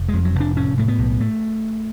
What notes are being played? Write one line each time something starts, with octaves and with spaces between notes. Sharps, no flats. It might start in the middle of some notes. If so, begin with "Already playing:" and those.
Already playing: F1
F2 G#3
F#3
F1 D4
A2 C#4
A2 A3
B3
B1
A3